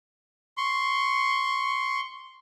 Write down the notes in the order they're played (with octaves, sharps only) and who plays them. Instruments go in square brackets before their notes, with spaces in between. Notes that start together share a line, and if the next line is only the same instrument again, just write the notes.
[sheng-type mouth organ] C6 C#6